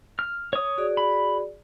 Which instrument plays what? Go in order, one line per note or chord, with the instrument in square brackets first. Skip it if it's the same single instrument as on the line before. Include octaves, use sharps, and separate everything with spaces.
[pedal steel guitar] F6
C#5 D#6
[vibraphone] F#4 G#4 D5
[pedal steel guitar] B5